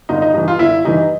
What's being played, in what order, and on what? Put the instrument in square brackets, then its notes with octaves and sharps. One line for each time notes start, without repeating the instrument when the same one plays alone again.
[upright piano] G1 D#4
D#4
G2 E3 D#4
F4
G1 E4
G2 E3 D#4